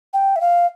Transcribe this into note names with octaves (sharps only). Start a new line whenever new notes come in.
G5
E5
F5